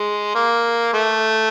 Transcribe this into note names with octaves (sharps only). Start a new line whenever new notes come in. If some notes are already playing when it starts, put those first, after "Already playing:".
Already playing: G#3
A#3
A3